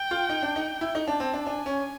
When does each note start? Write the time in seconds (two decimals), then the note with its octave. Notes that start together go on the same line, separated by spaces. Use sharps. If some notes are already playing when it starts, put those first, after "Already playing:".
Already playing: G5
0.11 F4
0.29 D#4
0.42 D4
0.56 D#4
0.81 E4
0.95 D#4
1.08 D4 A5
1.20 C4
1.34 D4
1.47 D4 G#5
1.66 C#4